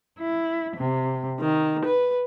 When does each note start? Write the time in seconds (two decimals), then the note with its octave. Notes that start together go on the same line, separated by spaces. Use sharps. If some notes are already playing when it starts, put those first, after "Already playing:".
0.19 E4
0.77 C3
1.41 D#3
1.85 B4